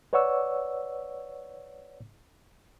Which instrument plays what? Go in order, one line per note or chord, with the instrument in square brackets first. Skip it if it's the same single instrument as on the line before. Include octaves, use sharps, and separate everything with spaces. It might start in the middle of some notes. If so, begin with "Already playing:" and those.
[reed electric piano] B4 C#5 D5 F#5 C#6 E6